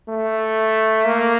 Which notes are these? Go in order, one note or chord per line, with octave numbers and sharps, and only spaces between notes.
A3
A#3